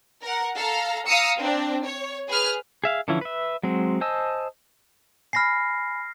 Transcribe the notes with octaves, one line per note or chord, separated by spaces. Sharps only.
A#4 F#5
A4 F5 A#5
F5 A#5 D#6 E6 C#7
C4 D4
C#5
G#4 B4 F6
G#4 E5 F5
D3 E3 F3 C#4 E4
B4 E5
F#3 G#3 C4
C5 D#5 G#5 A5 E6
G#5 B5 F6 A#6 C7